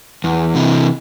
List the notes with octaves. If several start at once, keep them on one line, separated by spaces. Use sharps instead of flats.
E2
C3 E3